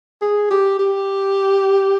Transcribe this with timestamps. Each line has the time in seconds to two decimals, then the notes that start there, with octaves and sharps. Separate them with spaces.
0.22 G#4
0.50 G4
0.79 G4